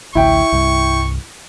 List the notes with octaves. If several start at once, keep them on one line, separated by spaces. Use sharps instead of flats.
A1 D2 E4 G5 C#6
C2 G2